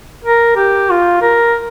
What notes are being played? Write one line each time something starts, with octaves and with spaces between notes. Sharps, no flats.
A#4
G4
F4
A#4